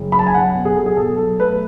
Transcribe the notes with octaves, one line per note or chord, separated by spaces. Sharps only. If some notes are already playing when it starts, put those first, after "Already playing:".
Already playing: F#1
F#2 B5
A5
G#5
B1 F#5
B2
G#4
B1 A4
G#4
B2 A4
B1 A4
A3 B4